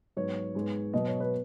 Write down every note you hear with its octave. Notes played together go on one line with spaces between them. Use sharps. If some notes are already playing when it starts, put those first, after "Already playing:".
G#2 F#3 B3 C#5
G#2 G#3 B3
B2 F#3 B3 D#5
C#5
B4